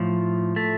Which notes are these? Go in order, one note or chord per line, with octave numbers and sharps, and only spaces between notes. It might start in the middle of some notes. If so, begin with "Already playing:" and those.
Already playing: A2 F3
A3